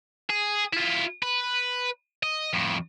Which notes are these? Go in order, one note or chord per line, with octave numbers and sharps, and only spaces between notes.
G#4
E4 F4
B4
D#5
F2 A2